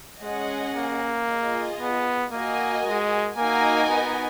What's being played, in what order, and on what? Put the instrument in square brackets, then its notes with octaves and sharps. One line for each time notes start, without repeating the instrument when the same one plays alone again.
[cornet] G#3 [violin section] C#4 G#4 D#5 F#5
[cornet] A#3
[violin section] F4 G#4 D#5
[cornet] B3
[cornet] A#3 [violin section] F#4 A#4 D#5 G#5
[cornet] G#3
[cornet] A#3 [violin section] D#4 F#4 A#4 D#5 G#5
[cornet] B3